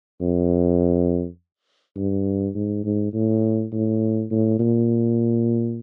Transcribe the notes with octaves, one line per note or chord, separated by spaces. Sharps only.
F2
G2
G#2
G#2
A2
A2
A2
A#2